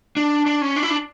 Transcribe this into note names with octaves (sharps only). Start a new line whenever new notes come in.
D4
D4
C#4
D4
E4
D4